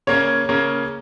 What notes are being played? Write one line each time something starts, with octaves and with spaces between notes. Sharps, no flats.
C#3 A#3 C#4 C#5
C#3 A#3 C#4